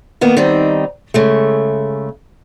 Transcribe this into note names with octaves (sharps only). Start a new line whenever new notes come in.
D#3 A#3 B3
D#3 G3 C4 D#4
C#3 G#3 A3